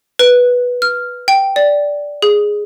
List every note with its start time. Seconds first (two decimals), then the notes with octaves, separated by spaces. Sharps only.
0.19 B4
0.82 F6
1.28 G5
1.56 D5
2.22 G#4